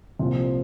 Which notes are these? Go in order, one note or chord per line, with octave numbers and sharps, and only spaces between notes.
C2 A#2 F3 C4